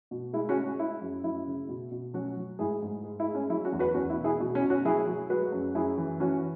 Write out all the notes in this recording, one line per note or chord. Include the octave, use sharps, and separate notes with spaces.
B2
G#3 E4
C#4 F#4
G#3
C#4
G#3 E4
F#2
F#2 E4
C#3
B2
B2
F#3 C#4 F#4
F#3
G#2 E4 G#4
G#2
G#3
E4
G#3
C#4
F#3 E4
C#4 F#4
E2
F#4 B4
E2 C#4 F#4
E4
B2
E4 G#4
B2
C#4
B2
C#4 F#4
F#3 E4 G#4
F#3
G#3 F#4 B4
F#2
F#2 E4 G#4
E3
E3 C#4 F#4